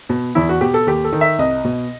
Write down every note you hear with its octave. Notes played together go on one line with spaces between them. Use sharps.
B2
E2 E4
F#4
B2 G4
A4
D#2 G4
A4
D#3
E5
C2 D#5
B2